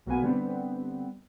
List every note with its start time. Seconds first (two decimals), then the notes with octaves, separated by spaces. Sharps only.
0.06 B1 B2 A#3 B3 G#5
0.22 D3 G3 B3 C4